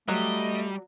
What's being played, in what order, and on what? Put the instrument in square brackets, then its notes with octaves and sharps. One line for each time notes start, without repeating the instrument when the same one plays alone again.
[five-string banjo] F#3 [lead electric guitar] G3 [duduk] A3 [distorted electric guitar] D#5